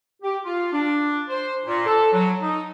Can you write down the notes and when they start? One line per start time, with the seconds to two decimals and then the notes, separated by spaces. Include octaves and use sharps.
0.23 G4
0.44 F4
0.72 D4
1.29 C5
1.65 A#2
1.86 A4
2.13 F#3
2.42 D#4